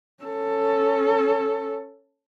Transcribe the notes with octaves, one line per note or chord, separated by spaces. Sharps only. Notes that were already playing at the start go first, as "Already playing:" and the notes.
C#4 A4